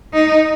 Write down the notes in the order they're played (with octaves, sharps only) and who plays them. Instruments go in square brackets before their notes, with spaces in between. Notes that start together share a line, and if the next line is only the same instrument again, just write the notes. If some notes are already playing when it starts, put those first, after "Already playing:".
[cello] D#4